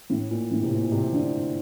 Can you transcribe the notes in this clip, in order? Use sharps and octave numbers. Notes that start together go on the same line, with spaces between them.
A2
A#2
A2
C3
A#2
A#2
C3
D3